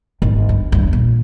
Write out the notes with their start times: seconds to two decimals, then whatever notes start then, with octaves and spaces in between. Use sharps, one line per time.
0.22 G#1 G#2
0.49 G2
0.72 E2 G2
0.93 A#2